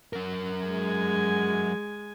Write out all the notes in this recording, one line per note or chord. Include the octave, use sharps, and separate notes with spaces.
F#3 A#4
G#3 G#5